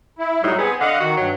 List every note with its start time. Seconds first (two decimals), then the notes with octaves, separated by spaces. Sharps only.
0.19 E4
0.43 A2 F#3 G3 D#4
0.58 B3 C4 G#4
0.80 D3 D#5 F5 F#5
1.00 D#3 F#4
1.17 G2 F#3